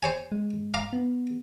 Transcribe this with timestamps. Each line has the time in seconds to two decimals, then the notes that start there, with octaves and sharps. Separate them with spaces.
0.03 C5 C#5 G#5
0.32 G#3
0.74 F5 A#5 D6
0.93 B3